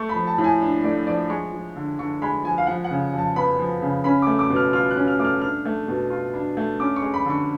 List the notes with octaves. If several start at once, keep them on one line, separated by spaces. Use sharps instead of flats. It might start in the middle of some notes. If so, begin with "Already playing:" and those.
Already playing: A3 C#6
B5
F3
A5
A2
G#5
D4
A3 D5
F3 D5
G#3 C#6
F3
D3
D3 C#6
G#3 B5
F3 G#5
F5
F3 F#5
F#5
C#3
F2 A5
B3 B5
F3
C#3
C#4 B5
A3 D6
D6
B2
F6
F4 F6
F#6
C#4
F6
A3 D6
F6
D4 F6
A3
B2
F4
D4
A3
C#4 D6
C#6
G#3
B5
D3 C#6